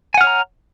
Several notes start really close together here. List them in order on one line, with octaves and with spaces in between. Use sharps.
G#5 F#5 F6 C#5 A#5